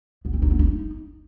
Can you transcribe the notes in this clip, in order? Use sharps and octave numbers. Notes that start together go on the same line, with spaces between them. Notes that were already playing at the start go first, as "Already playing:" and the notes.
B3
C4
D#4
B3
D#4